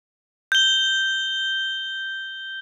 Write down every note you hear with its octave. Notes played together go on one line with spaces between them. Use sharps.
G6 G7